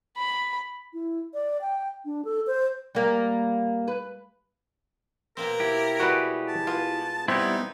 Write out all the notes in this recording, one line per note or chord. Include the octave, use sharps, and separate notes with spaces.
B5
E4
D5
G5
D4
A4
C5
G3 A#3
B4
B2 A#3 C4 A#4
E4 G4
G3 G#3 B3 F#4 B4
A5
B3 F4
G3 B3 C4 D#4 E4 G4